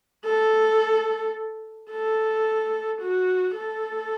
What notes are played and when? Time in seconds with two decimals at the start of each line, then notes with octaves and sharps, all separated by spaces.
0.25 A4
1.91 A4
3.02 F#4
3.57 A4